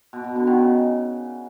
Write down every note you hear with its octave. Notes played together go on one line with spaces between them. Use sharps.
B2
B2
D3
D#3
C#3